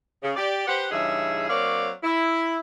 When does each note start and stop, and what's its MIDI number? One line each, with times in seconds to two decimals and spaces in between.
0.23 0.36 49
0.37 0.63 67
0.37 0.63 74
0.68 0.87 67
0.68 0.87 71
0.68 0.87 72
0.68 0.87 78
0.91 1.46 43
0.91 1.46 49
0.91 1.46 52
0.91 1.46 63
0.91 1.46 68
0.91 1.46 76
1.49 1.90 54
1.49 1.90 58
1.49 1.90 60
1.49 1.90 73
1.49 1.90 74
1.49 1.90 77
2.04 2.59 64